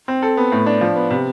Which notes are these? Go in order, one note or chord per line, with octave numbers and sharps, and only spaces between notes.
C4
A4
B3
A2
D4
F3
B3
C3